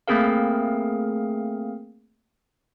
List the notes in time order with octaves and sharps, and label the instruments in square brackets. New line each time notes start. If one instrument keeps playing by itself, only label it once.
[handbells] A3 A#3 C4 G#4 A#4 F5